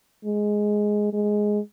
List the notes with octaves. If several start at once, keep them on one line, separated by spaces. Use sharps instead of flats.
G#3
G#3